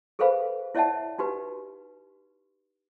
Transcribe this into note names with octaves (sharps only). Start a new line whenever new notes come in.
G#4 A4 B4 C5 F5 B5
E4 C#5 D5 E5 F#5 A5
D#4 F#4 G4 B4